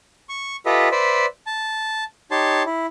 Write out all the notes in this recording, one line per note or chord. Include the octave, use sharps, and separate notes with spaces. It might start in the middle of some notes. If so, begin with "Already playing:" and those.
C#6
F4 G4 A4 B4 D#5 E5
B4 C5 D5 E5
A5
D#4 G4 C#5 A5 C6
E4